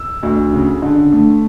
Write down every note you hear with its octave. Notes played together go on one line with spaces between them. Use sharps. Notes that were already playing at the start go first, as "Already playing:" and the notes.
Already playing: E6
D2
C#3
D3
A3